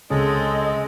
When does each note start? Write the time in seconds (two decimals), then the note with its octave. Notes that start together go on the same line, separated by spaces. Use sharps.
0.10 C#2 C#3 G#3 C4 C#4 G#4 A4 D#5